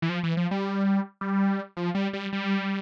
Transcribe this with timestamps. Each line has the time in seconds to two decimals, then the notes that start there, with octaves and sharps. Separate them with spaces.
0.02 E3
0.09 F3
0.24 E3
0.37 F3
0.51 G3
1.21 G3
1.77 F3
1.95 G3
2.13 G3
2.33 G3